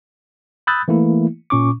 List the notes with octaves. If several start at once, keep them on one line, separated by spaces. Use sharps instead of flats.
B5 D#6 E6 F#6 G6 A6
E3 A3 A#3 E4
A#2 C#4 C#6 D6